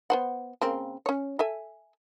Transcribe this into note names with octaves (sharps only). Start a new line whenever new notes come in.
B3 C5 F#5
C#3 A#3 C4
C#4 C#5
A4 E5 G#5